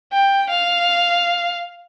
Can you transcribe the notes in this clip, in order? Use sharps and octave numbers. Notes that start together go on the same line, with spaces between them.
G5
F5